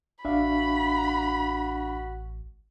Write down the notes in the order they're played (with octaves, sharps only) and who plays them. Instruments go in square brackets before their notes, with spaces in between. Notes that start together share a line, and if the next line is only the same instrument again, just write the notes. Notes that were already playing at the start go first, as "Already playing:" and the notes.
[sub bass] A1 [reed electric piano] D4 E5 F5 [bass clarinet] F#4 [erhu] B5